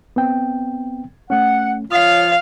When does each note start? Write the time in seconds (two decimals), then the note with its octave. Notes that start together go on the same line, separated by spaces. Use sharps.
0.16 B3 C4 G5
1.30 A3 C#4 F#5
1.92 F3 F4 C#5 F5 D#6